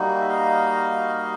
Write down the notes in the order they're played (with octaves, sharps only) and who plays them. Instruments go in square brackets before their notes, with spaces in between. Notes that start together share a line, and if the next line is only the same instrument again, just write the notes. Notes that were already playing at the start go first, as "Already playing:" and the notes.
Already playing: [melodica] G3 A#3 D#4 F#4
E5
D#5 F5